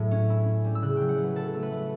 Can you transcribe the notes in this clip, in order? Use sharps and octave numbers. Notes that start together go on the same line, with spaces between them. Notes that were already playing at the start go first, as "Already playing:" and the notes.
Already playing: A2 F#3 A3
C#4
E4
C#4
G3
E6
C#3 F#6
F#3 G5
F#5
F#3
B4
F#3 A4
A3
B4
A3